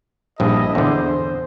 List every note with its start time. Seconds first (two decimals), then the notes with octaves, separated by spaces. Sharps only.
0.40 A#1 G2 E4 A4 D#5
0.75 E2 D3 C5